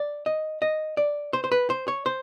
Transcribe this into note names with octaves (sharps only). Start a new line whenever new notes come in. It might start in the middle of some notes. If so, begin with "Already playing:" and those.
Already playing: D5
D#5
D#5
D5
C5
C5
B4
C5
C#5
C5